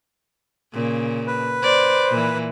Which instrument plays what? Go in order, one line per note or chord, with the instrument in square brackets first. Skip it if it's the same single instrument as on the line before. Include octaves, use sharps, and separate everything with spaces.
[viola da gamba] A#2 C#3
[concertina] B4
[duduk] C5 [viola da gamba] D5
[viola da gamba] A#2 E3